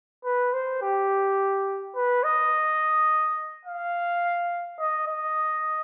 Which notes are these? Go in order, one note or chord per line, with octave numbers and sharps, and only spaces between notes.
B4
C5
G4
B4
D#5
F5
D#5
D#5